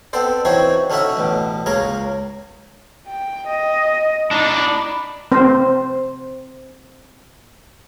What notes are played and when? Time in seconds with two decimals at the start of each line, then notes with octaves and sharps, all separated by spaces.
0.13 B3 C4 D4 A4 C5
0.45 E3 C4 D#4 F#4 C5 C#5
0.90 D3 C#4 D#4 F#4 E5 F#5
1.17 A1 B2
1.66 C#2 A#3 C#4 G#4 A#5
3.08 G5
3.48 D#5
4.31 D4 D#4 B5
5.32 C4 C5